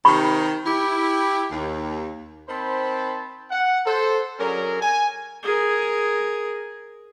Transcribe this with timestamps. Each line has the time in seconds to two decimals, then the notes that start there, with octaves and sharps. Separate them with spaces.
0.05 C3 D#3 B5 C#6
0.65 E4 G4
1.51 D#2
2.49 D#3 C4 C5 A5 B5
3.51 F#5
3.86 A4 C5
4.39 D3 F#3 C#4 G#4 A#4
4.81 G#5
5.43 G#4 A#4